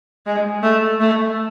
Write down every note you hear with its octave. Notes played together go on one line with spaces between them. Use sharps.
G#3
A3
A3